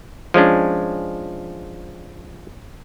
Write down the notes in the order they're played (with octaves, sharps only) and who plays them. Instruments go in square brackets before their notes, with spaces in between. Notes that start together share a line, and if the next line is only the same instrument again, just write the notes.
[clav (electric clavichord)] F3 G#3 C#4 D4